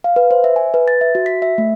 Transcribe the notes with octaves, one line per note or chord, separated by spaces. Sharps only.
F5
B4
C5
E5
G#5
B4
A6
E5
F#4
B6
E5
A3